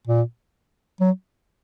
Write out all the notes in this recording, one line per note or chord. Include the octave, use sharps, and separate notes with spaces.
A#2
F#3